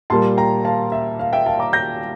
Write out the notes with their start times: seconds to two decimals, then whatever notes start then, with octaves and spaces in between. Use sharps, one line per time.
0.10 A#2 G3 A#3 A5 C6
0.37 G5 A#5
0.65 F5 A5
0.92 E5
1.19 F5
1.33 E5 G5
1.46 F5 A5
1.59 A#5 D6
1.73 G6 A#6